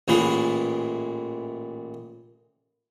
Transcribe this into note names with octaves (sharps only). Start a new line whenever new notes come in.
A1 A#2 E3 G#3 B5